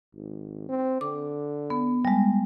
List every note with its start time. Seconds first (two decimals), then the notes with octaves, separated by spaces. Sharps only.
0.15 G#1
0.69 C4
1.01 D3 D6
1.70 B3
2.05 G3 G#3